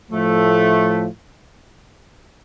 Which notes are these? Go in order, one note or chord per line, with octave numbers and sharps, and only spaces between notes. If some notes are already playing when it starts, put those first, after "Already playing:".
A2 F3 A3